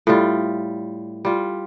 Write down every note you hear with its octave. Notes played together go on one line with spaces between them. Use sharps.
A2 G3 F4
G3 F4